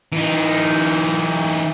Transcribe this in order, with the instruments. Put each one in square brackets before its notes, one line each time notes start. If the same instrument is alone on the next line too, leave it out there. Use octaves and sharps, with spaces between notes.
[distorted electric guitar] E3 D#4